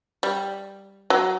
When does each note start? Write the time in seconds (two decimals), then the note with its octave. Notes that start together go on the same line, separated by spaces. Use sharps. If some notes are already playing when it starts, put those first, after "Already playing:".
0.23 G3
1.10 F#3